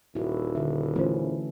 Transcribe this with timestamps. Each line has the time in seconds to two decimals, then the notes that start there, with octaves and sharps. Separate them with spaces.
0.15 D#1 E4 F#4
0.55 D3 E4 E5
0.96 E3 A3 C#4 F4 C5